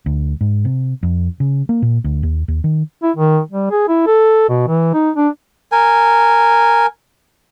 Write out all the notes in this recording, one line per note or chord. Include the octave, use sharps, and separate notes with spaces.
D2
G#2
C3
F2
C#3
A#3
A#2
D2
D#2
D#2
D#3
E4
D#3
G3
G#4
E4
A4
B2
E3
D#4
D4
A#4 G#5